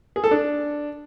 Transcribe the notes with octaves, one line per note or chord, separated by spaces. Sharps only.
G#4
A4
D4